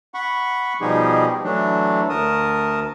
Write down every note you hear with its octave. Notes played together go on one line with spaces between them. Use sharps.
F#5 B5 C#6
B2 F3 G3 D#4 G4 G#4
E3 F#3 A3 D4
D2 A#4 A5 D#6